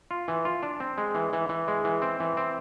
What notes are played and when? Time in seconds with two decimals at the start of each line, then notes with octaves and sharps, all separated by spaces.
0.11 F4
0.28 E3
0.45 F4
0.63 D4
0.80 C4
0.98 G#3
1.15 E3
1.33 E3
1.49 E3
1.68 G#3
1.84 E3
2.02 C4
2.20 E3
2.37 C4